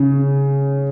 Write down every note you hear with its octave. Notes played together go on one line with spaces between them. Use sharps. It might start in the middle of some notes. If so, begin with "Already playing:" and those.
Already playing: C#3